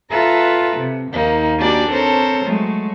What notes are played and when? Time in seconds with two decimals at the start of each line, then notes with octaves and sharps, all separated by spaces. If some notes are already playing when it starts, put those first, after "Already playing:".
0.10 F4 A4 B4 E5 A#5
0.77 C3
1.11 D#2 A#3 D#4
1.58 A#3 D4 F#4 G4 D5 G#5
1.90 C4 A4 A#4 C5 C#5
2.44 F#3 G#3 A3